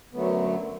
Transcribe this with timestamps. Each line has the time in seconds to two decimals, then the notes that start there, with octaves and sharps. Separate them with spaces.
0.13 F#2 D3 F#3 A3 B3